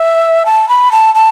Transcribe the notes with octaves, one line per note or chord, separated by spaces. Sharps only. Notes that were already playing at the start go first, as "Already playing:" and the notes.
Already playing: E5
A5
B5
A5
A5